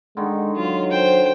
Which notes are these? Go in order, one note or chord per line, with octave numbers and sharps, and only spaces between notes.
D3 D#3 G#3
F#3 F4
C5 G5